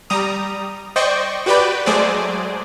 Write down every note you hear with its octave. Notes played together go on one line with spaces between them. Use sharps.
G3 A#5 D#6
C5 D5 D#5 G5 C#6
F#4 G4 B4 D5 G5 B5
F#3 G#3 A3 G#4 C5 D5